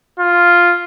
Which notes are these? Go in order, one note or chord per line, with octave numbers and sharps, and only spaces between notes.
F4